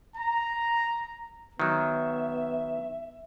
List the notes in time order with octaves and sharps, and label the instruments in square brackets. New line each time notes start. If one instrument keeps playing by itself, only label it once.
[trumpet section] A#5
[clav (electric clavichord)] D#3 F#3 [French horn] B3 [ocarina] E5